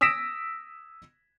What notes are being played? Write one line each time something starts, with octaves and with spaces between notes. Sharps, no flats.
D#6 E6 A#6 B6 D7 E7